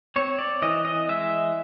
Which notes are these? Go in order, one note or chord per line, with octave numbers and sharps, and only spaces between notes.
C4 C#5
D5
E3 D#5
D#5
G#3 E5